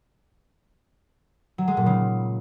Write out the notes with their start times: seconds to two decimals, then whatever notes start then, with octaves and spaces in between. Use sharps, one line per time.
1.58 F#3
1.68 G#3
1.77 A#2
1.86 C#3